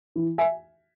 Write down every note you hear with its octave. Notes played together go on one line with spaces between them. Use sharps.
E3
E5 G#5